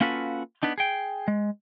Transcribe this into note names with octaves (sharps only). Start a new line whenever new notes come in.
A#3 C#4 F4 F#4 A4 B4
B3 D4 D#4
G#4 G5
G#3